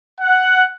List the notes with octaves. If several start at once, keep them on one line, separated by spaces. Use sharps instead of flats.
F#5